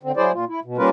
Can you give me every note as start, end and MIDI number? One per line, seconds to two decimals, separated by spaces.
0.03 0.12 50
0.03 0.12 60
0.17 0.32 54
0.17 0.32 64
0.17 0.32 68
0.17 0.32 72
0.17 0.32 74
0.32 0.45 46
0.32 0.45 65
0.48 0.60 64
0.65 0.77 47
0.77 0.90 55
0.77 0.90 58
0.77 0.90 61
0.77 0.90 65
0.77 0.90 70
0.77 0.90 71